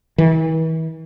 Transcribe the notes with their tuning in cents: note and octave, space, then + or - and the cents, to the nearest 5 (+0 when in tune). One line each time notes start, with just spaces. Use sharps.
E3 -40